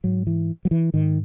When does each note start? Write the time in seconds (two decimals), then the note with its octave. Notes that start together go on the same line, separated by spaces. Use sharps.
0.04 G#2 F#3
0.27 E3
0.65 F#3
0.71 E3
0.94 G#2 D#3